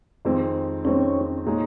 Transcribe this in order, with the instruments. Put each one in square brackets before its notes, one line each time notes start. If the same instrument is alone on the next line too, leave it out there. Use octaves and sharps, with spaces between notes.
[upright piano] F2 D#3 G#3 C4
[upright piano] F2 D#3 G#3 C4 [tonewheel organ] C#4
[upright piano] A#2 G#3 D#4 G#4 C#5